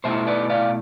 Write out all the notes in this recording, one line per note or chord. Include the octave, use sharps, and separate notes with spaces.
B2 A3 E4 C5 E5
B4 D5
D5 F5